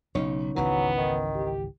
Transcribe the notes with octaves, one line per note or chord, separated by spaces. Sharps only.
B1 C#3 D#4 C#5
G#1 C#2 E3 F#3 B3
D#3
G4